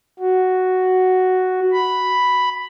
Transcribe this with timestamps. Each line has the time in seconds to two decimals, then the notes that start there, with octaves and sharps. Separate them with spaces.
0.20 F#4
1.72 B5